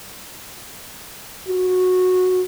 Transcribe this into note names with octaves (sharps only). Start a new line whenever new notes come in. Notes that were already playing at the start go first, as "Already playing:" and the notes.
F#4